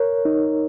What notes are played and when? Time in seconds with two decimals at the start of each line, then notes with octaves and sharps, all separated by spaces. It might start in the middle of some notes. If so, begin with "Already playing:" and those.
Already playing: A#4 C#5
0.25 D#4